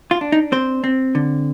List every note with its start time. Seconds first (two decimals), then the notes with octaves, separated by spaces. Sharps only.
0.11 F4
0.21 D4
0.32 D#4
0.52 C4 C5
0.84 C4
1.15 D3